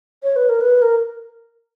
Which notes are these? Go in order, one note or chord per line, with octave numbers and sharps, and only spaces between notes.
C#5
B4
A#4
B4
A#4